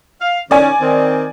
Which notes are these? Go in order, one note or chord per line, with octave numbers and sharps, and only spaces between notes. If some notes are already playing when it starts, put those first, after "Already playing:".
F5
D#3 C#4 D5 G#5
D#3 C4